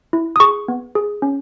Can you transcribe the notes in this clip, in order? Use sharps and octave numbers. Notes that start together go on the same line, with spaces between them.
E4
D#6
G#4 C#6
B3
G#4
C#4